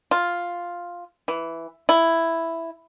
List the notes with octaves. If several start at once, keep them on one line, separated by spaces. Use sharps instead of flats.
F4
E3
E4